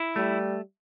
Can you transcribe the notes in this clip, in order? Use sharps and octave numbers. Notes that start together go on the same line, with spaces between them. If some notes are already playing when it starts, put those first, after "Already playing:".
Already playing: E4
G3 A3